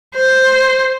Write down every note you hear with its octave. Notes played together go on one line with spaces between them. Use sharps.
C5